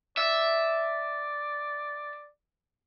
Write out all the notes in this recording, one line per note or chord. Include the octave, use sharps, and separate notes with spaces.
D5 E5